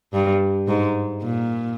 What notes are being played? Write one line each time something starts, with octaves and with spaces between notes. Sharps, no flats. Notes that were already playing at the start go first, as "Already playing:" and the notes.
G2
G#2
A#2